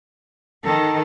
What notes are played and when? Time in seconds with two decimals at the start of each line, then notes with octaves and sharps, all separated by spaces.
0.64 D#3 A4